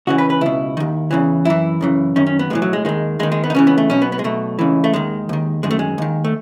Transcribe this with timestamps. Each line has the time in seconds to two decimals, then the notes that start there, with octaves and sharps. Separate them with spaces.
0.07 C#2 C#3 E3 F#4
0.18 B4
0.30 B4
0.41 C#2 B2 E4
0.77 D#2 D#3
1.11 E2 C#3 E3
1.45 F#2 E3 E4
1.81 F#2 C#3 E3
2.16 F#2 D#3 C#4
2.27 C#4
2.39 B3
2.50 B1 A2 E3 G#3
2.62 F#3
2.73 G#3
2.85 D#2 D#3 G#3
3.19 D#2 G#3
3.23 D#3
3.32 G#3
3.44 B3
3.50 D#4
3.55 C#2 C#3 E3 C#4
3.67 B3
3.78 A3
3.90 B1 B2 C#4
4.02 B3
4.12 B3
4.19 G#3
4.24 B1 B2 A3
4.59 C#2 C#3 E3
4.84 A3
4.93 D#2 D#3 G#3
5.29 D#2 D#3
5.63 F#2 D#3 G#3
5.71 A3
5.79 G#3
5.98 D#2 D#3
6.25 A3